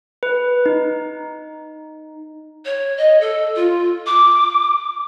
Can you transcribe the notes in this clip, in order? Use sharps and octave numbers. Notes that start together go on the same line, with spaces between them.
B4
D#4
C#5
D#5
A4
F4
D6